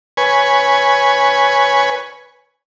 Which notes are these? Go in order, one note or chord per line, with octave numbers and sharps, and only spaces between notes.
B4 C#5 G#5